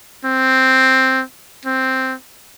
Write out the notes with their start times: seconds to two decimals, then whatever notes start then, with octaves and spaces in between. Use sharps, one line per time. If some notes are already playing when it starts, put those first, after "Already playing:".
0.25 C4
1.65 C4